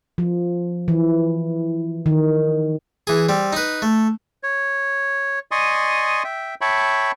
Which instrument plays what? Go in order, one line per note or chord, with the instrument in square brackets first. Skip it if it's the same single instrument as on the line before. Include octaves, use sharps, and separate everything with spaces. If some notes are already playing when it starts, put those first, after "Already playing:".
[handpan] F3
E3
D#3
[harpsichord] E3 G#4
G3 C4
D#4 B4
A3
[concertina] C#5
D5 D#5 G#5 C6 C#6 D#6
E5 G5
C#5 E5 G5 A5 B5 C#6